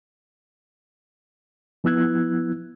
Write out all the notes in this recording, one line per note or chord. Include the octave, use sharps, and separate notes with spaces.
F3 B3 E4 E6 F#6 G#6